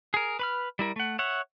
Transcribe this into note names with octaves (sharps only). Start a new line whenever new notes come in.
G#4 A#4
B4 B5 F6
G3 E4 A#4
A3 F#5
C#5 E5 F#5